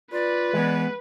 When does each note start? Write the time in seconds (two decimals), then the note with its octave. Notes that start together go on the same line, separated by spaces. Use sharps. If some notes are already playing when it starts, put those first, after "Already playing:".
0.12 F4 B4 D5
0.53 E3 G#3 B3